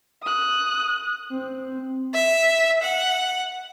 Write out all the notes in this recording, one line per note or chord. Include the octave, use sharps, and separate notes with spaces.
D#6 F#6
C4
E5
F#5